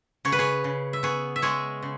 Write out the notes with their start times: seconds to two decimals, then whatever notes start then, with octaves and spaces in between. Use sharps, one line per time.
0.25 C#3 C#5
0.32 B4
0.39 G#4 C#5
0.64 C#3
0.93 E5
1.03 B3 G#4 C#5
1.36 E5
1.42 G#3 G#4 C#5
1.82 C#3